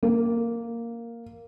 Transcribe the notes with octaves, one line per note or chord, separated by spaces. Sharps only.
A#3